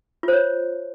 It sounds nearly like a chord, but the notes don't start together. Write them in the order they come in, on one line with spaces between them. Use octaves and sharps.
F4 C5 C#5